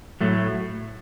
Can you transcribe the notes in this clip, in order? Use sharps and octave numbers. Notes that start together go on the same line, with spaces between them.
A2 F#3 A3